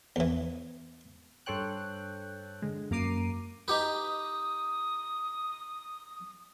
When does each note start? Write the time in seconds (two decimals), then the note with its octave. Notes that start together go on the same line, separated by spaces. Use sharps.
0.16 E2 E3
1.46 G2 A4 C5 C#5 G5 F#6
2.62 D3 G#3
2.91 F#2 A#3 A#5 D6 C7 D#7
3.68 D#4 G4 B4 D#6